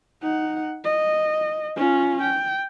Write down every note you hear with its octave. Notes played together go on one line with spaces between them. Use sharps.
D#4 F#5
D#5
C#4 F4
G5